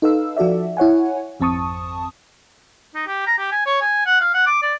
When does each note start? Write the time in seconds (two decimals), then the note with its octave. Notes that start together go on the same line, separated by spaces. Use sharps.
0.02 D#4 A4 B4 F5 E6
0.37 F3 F#4 A4 D5 E5
0.77 E4 C#5 F#5 G#5
1.40 G#1 F2 C4 A5 C#6 D#6
2.95 D#4
3.07 G4
3.27 A#5
3.38 G4
3.52 G#5
3.66 C#5
3.81 G#5
4.06 F#5
4.21 F5
4.34 F#5
4.47 D6
4.62 D5